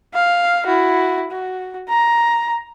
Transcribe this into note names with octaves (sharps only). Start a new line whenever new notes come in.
F5
E4 F#4
F#4
A#5